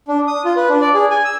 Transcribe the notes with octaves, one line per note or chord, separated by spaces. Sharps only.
D4
D#6
F4
B4
D4
D5
G#4
G#5
E6